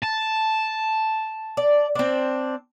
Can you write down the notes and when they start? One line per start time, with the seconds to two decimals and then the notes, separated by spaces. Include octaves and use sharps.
0.03 A5
1.57 D5
1.95 C4 D4